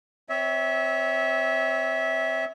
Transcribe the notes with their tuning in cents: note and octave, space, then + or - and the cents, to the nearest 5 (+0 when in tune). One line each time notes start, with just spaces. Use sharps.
C4 +0 C#5 +20 E5 -20